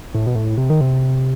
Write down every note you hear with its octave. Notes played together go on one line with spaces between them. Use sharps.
A2
B2
A2
C3
D#3
C3